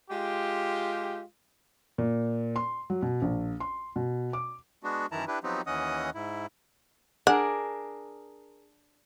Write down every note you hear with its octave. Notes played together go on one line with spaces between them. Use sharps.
G#3 F4 G4
A#2
C6
F#3
B2
A#1
C6
B2
D6
G#3 B3 D4 F#4
F#2 D#3 E3 E4 A5 A#5
D4 E4 G4 B4
F3 F#3 B3 C4 D#4 G4
D#2 E3 C#4 D#5 F#5 D#6
G#2 E4
D4 G#4 A#4 F#5